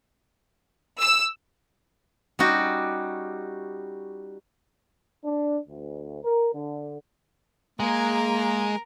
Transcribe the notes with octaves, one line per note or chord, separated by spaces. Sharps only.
E6
G3 C#4 D#4 F#4 G4
D4
D2
A#4
D3
G#3 A#3 A#4